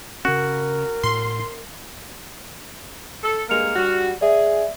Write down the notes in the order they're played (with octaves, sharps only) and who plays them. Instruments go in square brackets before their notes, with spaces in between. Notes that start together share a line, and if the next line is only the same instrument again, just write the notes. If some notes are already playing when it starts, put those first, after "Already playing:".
[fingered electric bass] C#3 C#4 [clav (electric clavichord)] F#4 [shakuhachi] A#4
[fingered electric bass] A2 [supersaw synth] C6
[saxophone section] A4
[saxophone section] G2 G#3 A#3 [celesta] F6 C#7 F7
[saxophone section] G2 G3 F#4
[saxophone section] G#4 [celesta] D5 E5